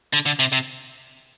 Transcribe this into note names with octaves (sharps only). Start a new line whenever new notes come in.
D3
D3
C3
C3